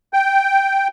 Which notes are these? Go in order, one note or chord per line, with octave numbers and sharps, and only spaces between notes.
G5